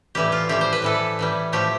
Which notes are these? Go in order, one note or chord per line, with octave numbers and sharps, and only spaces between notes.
A2 E3 G3 G4
F4
A2 E3 G3 G4
C5
B4
A2 E3 G3 A4
A2 E3 G3
A2 F3 A3 G4